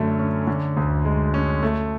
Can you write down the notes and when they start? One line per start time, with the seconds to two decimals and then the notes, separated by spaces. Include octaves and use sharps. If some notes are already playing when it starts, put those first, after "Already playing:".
Already playing: F#2 D3 A3
0.19 C#4
0.47 D3
0.77 D2
1.05 G#3
1.34 C#4
1.63 A3